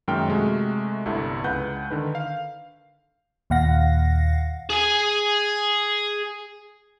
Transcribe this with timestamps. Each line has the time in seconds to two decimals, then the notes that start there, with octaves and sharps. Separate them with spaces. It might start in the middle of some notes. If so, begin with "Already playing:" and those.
0.08 F#2 D#3 G#3 A#3 G5 F6
0.28 C3 G#3 A3 F#4
1.05 G1 C2 G2 E4 A4
1.44 C#2 B4 F#5 G6
1.91 D3 D#3 B4
2.15 F5
3.50 D#2 A#2 F5 F#5 A#6
4.70 G#4 G#5